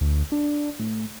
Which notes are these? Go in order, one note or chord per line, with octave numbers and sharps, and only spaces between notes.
D2
D4
A2